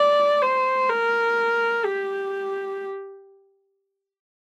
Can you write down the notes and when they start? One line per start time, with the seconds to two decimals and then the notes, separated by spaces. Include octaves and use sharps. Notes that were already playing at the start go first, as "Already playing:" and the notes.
Already playing: D5
0.42 C5
0.89 A#4
1.84 G4